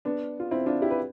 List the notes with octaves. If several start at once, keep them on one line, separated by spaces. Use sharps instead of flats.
B3 D4
F4
C4 E4
D4 F4
E4 G4
B4